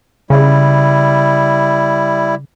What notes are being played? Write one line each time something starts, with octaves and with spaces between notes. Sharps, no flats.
C#3 G3 E4